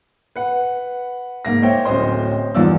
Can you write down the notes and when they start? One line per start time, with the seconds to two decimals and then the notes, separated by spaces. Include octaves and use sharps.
0.36 B4 F#5
1.45 G#2 A#3 A#6
1.62 C5 C#5 E5 G5
1.85 D1 C#4 C5 D#5 C6
2.55 E2 G2 D#3 F4 D5 E6